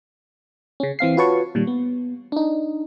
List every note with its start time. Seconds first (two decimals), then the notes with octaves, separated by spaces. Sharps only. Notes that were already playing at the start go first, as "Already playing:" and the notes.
0.80 C#3 C#4
0.99 E3 C4 F5 C7
1.17 F4 F#4 B4 C#5 A5 C#6
1.55 A#2 D#3 G3
1.67 B3
2.32 D4 D#4